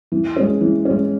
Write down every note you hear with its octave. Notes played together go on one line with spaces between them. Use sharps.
E3
G#3 C#4
E3
G#3 C#4